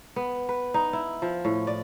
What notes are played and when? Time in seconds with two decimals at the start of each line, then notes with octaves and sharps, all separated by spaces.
0.16 B3
0.49 B4
0.74 D#4
0.93 E4
1.22 F3
1.45 A2
1.67 D5